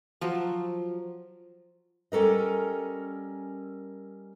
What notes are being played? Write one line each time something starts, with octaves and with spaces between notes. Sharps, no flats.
F3 F#3
G3 C#4 A4 A#4 D#5